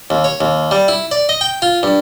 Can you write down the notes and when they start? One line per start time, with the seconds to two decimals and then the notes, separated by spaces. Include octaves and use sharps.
0.10 D#2
0.24 C#5
0.41 D#2
0.71 G3
0.88 E4
1.11 D5
1.29 D#5
1.41 G5
1.62 F4
1.83 G2